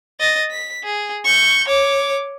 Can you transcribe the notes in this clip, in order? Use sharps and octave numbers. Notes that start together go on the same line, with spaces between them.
D#5 A6
B6
G#4
C#6 G6
C#5 D6